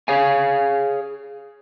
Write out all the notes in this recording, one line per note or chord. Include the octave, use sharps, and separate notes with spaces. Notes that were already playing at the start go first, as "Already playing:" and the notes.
G#4 C#5 F5 G#5